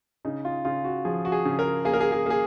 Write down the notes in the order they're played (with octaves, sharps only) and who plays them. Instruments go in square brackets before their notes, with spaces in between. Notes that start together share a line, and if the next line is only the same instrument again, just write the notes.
[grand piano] C#3 D#4
F4
C#3 F4
F#4
F3 G#4
F#4
G#4
C#3
A#4
A#3 G#4
A#4
G#4
G#4
A#3 G#4